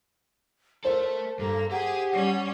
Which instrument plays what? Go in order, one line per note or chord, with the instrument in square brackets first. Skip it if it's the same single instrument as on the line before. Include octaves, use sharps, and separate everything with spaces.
[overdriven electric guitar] A3 A4 [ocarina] A#4 [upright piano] C5
[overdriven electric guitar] G2 [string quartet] A#3 [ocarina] A4
[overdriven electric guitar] G4 G5 [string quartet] G#4 [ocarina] F#5
[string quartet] G3 C#4